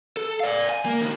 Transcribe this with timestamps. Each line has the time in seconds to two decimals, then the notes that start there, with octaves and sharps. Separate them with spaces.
0.17 A4
0.40 D5 F5
0.69 G#5
0.85 A#3
1.01 C2 D#3